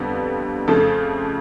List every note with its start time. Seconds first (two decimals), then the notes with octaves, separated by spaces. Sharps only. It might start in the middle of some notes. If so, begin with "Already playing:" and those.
Already playing: F2 D3 G3 B3
0.67 F2 C#3 F3 A3 A4